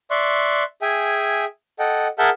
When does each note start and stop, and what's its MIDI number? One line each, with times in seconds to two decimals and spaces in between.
0.11 0.63 74
0.11 0.63 76
0.11 0.63 84
0.11 0.63 85
0.11 0.63 90
0.82 1.45 68
0.82 1.45 76
0.82 1.45 79
0.82 1.45 80
1.79 2.08 69
1.79 2.08 75
1.79 2.08 78
1.79 2.08 79
2.19 2.30 68
2.19 2.30 70
2.19 2.30 76
2.19 2.30 78
2.19 2.30 81
2.19 2.30 91